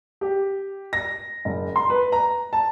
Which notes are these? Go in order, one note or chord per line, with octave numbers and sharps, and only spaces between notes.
G4
A#6
F#1
C6
B4
A#5
A5